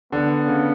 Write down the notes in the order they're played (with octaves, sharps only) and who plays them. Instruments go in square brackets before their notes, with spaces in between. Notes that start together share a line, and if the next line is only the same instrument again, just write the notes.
[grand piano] D3 [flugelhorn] B3
[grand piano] C#3